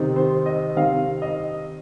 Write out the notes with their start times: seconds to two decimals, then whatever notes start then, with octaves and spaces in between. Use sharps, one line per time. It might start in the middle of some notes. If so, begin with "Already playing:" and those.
Already playing: C3 D#3 C4 D#4
0.16 C5
0.46 D#5
0.76 C3 D#3 C4 D#4 F5
1.22 D#5